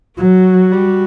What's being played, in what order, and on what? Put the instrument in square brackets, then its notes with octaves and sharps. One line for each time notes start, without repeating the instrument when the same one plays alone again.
[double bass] F#3 [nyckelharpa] F#4
[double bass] G3